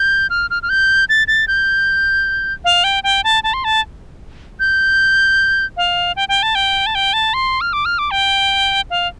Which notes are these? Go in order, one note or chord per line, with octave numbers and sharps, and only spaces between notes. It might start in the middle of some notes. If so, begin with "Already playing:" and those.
Already playing: G6
F6
F6
F6
G6
A6
A6
G6
F5
G5
G5
A5
A5
C6
A5
G6
F5
G5
G5
A5
G5
A5
G5
A5
C6
F6
D6
F6
D6
G5
F5